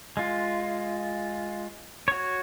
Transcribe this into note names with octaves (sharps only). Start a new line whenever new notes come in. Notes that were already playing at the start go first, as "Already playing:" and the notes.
G#3 F4
F#4 C#5